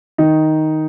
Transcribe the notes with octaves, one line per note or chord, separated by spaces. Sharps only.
D#3 D#4